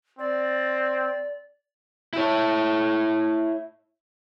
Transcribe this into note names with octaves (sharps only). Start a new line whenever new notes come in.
C4 D5
E4 C#5